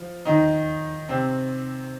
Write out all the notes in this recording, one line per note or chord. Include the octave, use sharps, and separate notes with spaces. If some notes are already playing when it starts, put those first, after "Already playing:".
Already playing: F3
D#3 D#4
C3 C4